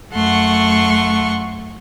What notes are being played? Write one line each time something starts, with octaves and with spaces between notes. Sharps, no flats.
F#2 A3 F#5 C6 C#6